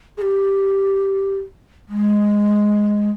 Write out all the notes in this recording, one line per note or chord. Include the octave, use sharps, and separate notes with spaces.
G#4
G4
G#3